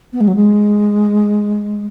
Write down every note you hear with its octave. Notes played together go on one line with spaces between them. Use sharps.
B3
G#3
F#3
G#3